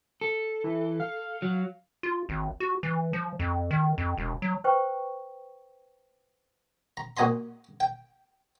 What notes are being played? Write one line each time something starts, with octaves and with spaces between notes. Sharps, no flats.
A4
E3
F5
F#3
F4
G#1
F#4
E3
F3
F2
D#3
F2
E1
F#3
B4 C5 G5 C#6
A#5
A#2 F#4 D#5 G#5 A#5 C6
G5